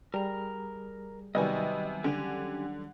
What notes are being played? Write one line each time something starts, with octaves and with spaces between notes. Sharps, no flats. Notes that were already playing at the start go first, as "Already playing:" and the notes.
G3 G#4 A#4 A#5
C3 D#3 F#3 G3 B3 D#5 G#5 C#6
D3 C#4 G4 G#5